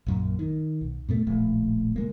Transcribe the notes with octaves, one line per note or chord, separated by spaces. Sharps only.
A#1 F#2 A#2
D#3
B1
G#2 B2 A3
D1 A#1 A3
C#3 G#3 A#3